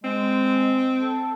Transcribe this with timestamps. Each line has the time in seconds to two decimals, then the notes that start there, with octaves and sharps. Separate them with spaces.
0.04 G#3 C4
1.00 A4